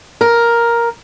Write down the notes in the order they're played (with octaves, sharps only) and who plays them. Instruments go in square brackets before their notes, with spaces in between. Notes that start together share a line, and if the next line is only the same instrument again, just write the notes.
[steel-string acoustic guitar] A#4